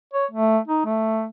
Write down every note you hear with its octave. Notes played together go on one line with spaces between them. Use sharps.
C#5
A3
D#4
A3